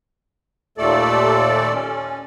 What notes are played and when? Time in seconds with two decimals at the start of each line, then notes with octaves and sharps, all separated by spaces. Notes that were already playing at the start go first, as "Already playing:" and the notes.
0.78 D#2 A#2 A3 A4 D5
1.74 C#4